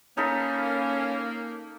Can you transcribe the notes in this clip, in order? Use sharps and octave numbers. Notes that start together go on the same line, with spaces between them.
A#3 C#4 D#4 A4 B5